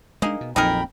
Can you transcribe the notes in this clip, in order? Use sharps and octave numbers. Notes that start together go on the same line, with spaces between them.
G#3 A#3 D4 D#4 G#4
B2
A#1 F2 F#3 D#4 G#4 A#4 G5 B5